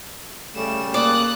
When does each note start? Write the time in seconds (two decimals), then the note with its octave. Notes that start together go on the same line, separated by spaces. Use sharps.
0.56 C#3 G3 A3 E7
0.94 A#3 D5 D#6 F#6